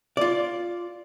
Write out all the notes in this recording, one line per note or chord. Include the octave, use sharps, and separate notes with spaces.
F4 D5